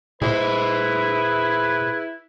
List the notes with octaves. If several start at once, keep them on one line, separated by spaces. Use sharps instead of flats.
A#2 E4 G#4 B4 C5